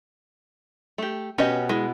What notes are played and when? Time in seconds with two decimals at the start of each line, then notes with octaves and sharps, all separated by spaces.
0.98 A3 G4
1.38 B2 C#4 G4 D#5
1.69 G#3 E4